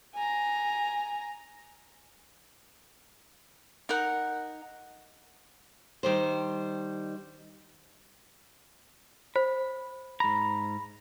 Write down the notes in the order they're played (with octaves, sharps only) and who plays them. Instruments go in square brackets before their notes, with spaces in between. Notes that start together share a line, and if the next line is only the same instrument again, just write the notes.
[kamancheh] G#5 A#5
[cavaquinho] D#4 A#4 F#5
[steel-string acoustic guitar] D#3 G3 C5
[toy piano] C5 [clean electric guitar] B5
[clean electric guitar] G#2 A#5 [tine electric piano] B5